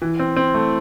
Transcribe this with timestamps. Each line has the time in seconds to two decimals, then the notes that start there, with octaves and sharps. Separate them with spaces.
0.02 E3
0.19 C4
0.36 C4
0.54 A3